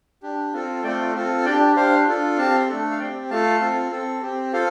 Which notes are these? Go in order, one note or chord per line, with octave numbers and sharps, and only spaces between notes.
D4 G4
C4 F4 A4
A3 C4 F4 A4 D5 G5
C4 F4 A4
D4 G4 D5 G5
D4 G4 C5 F5
D4 F4 A4
C4 G4 F5 A5
A3 D4 A4
F5
C4 G4 D5 G5
A3 F4 A4 F5 A5
C4 F4 A4
C4 A4
C4 G4
F4 A4 C5 F5